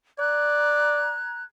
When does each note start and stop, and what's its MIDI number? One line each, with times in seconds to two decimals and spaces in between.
0.19 1.18 74
0.19 1.43 82
0.19 1.43 90
0.19 1.43 92